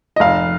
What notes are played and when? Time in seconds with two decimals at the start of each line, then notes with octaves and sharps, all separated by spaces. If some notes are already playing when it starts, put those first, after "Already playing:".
0.16 D#5
0.20 F1 F5